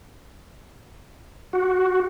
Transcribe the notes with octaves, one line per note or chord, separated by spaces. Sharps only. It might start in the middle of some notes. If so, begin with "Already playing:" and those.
F#4